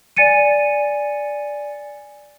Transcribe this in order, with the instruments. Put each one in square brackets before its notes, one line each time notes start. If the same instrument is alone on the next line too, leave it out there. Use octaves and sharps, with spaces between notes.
[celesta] D5 G#5 A6 C#7 D#7